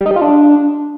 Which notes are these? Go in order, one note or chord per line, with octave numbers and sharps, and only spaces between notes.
G3
D#4
G3
F4
D4